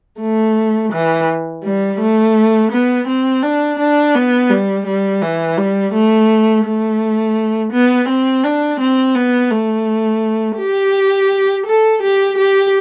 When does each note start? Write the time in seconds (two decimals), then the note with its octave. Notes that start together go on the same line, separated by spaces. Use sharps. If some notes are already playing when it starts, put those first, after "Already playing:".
0.21 A3
0.92 E3
1.64 G3
2.00 A3
2.72 B3
3.07 C4
3.43 D4
3.79 D4
4.14 B3
4.50 G3
4.86 G3
5.22 E3
5.58 G3
5.93 A3
6.65 A3
7.72 B3
8.08 C4
8.44 D4
8.80 C4
9.15 B3
9.51 A3
10.58 G4
11.66 A4
12.02 G4
12.38 G4